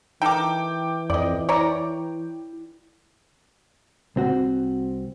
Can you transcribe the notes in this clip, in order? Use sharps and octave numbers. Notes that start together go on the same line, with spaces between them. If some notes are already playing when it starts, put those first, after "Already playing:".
E3 D#4 A4 A#4 G5 D6
F2 D5 D#5
E4 C#5 D5 A#5
C2 C4 F#4